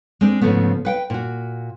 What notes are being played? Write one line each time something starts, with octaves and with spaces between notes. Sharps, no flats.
G#3 C4 D4
G#2 C#3 F3 A3 B3
B4 F#5 G5
A#2 F#4